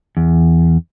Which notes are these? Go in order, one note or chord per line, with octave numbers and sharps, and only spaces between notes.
E2